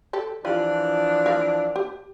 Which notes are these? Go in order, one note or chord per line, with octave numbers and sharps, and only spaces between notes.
G4 A4
E3 F3 D4 F4 G4
A#4 D5 F5
G4